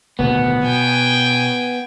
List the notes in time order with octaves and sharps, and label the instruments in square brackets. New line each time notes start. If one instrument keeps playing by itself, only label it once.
[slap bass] D1 B2 D#3 [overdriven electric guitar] B3
[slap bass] B2 [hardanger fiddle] G5 G#5